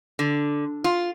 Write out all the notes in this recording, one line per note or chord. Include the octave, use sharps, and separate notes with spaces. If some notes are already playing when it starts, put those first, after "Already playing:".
D3
F4